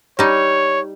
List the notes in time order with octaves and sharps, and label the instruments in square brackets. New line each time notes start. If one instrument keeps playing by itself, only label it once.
[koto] G3 D#4 [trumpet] C#5